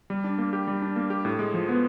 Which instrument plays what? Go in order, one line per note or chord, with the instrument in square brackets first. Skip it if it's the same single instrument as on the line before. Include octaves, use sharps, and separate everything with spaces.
[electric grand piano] G3
D4
A#3
G4
G3
D4
A#3
G4
A2
G#3
F3
B3